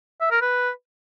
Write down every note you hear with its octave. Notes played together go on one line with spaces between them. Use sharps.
E5
A#4
B4